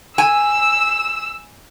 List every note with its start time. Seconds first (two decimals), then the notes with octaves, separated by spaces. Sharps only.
0.18 G#5 E6